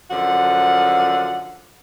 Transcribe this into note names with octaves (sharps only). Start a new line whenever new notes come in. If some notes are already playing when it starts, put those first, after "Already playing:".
F#2 D3 F3 F#5